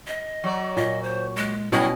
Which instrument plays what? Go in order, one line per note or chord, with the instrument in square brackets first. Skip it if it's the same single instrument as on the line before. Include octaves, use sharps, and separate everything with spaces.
[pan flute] D#5
[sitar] F#3 C#5 D5
[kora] A#2 [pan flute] D#5
[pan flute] C5
G#3
[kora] B2 C#4 D#5 [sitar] F#3 G3 C#5 [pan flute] E4